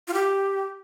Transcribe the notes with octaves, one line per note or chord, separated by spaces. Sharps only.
F4
G4